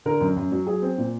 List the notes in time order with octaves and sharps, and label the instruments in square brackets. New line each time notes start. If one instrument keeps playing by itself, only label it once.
[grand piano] D3 A#4
F#2
F#2
F#3
F#3 G#4
C4
A#2